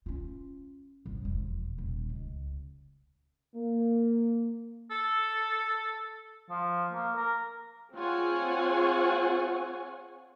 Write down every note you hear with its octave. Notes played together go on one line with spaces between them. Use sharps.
C#4 F4
G1 E4
E1 F2
D#1
C#2
A#3
A4
F3
A#3
A#4
C4 F4 G#4 C#5 F#5 G#5